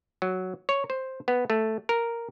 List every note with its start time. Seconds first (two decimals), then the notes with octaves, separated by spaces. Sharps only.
0.22 F#3
0.69 C#5
0.90 C5
1.28 B3
1.50 A3
1.89 A#4